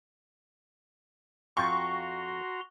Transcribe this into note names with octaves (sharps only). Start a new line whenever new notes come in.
F2 F4 F#4 G5 A#5 C6 C#6